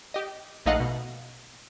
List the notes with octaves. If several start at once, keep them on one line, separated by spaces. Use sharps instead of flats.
G4 D#5
A#1 A3 D#4 D#5 F5 F#5
B2